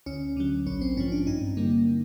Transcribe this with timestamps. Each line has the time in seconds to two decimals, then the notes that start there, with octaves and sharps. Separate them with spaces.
0.06 D2 C#4
0.37 D3 F#3
0.66 A#1 C#4
0.81 C4
0.97 G#2 F3 C#4
1.12 D4
1.27 G2 D#4
1.57 D3 G3 A#3